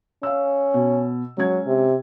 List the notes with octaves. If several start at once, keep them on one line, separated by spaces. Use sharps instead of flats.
C#4 F5 E6
B2
F#3 G#3 C#4 G#6
C3